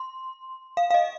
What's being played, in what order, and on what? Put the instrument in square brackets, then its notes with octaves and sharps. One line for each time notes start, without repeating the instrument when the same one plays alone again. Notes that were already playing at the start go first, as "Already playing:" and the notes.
Already playing: [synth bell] C6
F5
F5
D#5